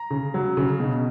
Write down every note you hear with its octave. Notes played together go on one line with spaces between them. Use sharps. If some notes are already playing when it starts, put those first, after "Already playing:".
Already playing: A#5
C#3
F#3
C#3
B2